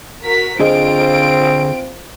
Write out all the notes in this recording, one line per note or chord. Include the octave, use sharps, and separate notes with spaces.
F#4 A#4 B6
D3 C4 F4 G#4 C5 D#5 D7